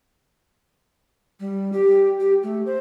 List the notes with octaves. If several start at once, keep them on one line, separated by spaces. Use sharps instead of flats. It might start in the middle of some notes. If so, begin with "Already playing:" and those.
G3
G4
G4
A3
C5